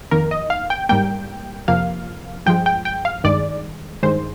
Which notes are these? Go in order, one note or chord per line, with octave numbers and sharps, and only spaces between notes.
F2 D#3 A#3 A#4
D#5
F5
G5
G#2 G3 A#3 G5
F2 C3 F3 A#3 F5
G2 F3 G#3 G5
G5
G5
F5
G2 D#3 G#3 D5
G2 D#3 G#3 C5